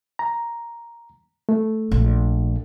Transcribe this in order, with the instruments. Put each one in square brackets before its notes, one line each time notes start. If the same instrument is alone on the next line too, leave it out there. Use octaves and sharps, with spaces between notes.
[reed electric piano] A#5
A3
[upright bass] A#1